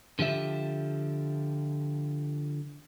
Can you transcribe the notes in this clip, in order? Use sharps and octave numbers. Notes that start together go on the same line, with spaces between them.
D3 F3 G4 E5